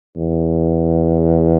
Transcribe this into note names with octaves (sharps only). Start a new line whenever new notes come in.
E2